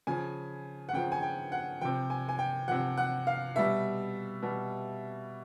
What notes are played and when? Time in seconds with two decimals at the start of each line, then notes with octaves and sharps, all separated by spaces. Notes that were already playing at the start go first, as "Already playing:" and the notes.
0.07 C#3 F3 G#5
0.89 F#5
0.93 C#3 F3 G5
1.12 G#5
1.22 G5
1.52 F#5
1.81 C3 F3 G5
2.10 G#5
2.29 G#5
2.39 G5
2.68 C3 F3 F#5
2.97 F#5
3.27 F5
3.56 B2 G3 E5
4.42 B2 G3